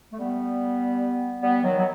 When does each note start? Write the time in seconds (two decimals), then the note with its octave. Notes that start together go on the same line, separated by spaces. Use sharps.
0.12 A3
0.18 G3 B3
1.42 G3 B3
1.62 D#3 F#3
1.78 F#3